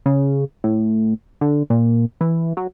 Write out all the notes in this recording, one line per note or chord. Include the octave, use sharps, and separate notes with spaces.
C#3
A2
D3
A#2
E3
F#3